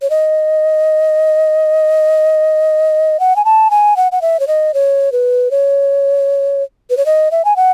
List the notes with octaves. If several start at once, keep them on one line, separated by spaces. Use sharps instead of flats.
C#5
D#5
F#5
G#5
A5
G#5
F#5
F#5
E5
C#5
D#5
C#5
B4
C#5
B4
C#5
D#5
E5
G#5
F#5